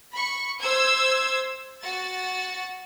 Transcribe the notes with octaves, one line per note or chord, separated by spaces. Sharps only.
B5 C#6
C5 E6 G#6
F#4 A6